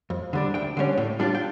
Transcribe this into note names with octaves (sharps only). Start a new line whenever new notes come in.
F2
D3 G3 D4
D2 G5
D3 G3 C#4
A2
G3 D4 F4
G5